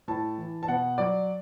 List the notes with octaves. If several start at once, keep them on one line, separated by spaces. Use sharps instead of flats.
A2 A5
E3
A5
B2 F#5
F#3 D5